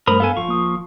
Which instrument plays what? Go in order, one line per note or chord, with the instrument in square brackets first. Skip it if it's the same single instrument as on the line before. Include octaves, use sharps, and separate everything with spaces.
[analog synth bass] G2 [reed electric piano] G3 A3 C5 [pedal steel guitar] A#4 B5 D#6
[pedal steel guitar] B3 A4 G#5 [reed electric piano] F5
[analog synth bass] D1 [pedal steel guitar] F3 F4 C#6
[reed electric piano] A#3 D#6